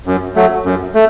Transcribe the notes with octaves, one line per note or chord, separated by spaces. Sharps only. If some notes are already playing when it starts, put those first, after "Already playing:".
F#2
F#3 A3
F#2
A3